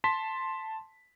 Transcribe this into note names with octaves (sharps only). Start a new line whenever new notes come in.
A5 C6 B6